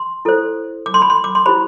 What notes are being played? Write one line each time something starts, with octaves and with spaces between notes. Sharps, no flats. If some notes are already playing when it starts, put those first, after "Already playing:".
Already playing: C6
E4 A4 C5
D6
C6
B5
C6
D6
C6
E4 G4 C5 B5